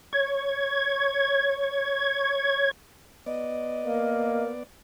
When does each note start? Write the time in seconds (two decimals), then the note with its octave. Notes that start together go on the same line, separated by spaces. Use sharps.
0.13 C#5 G#6
3.26 B3 D5 D#5
3.84 A#3 A#4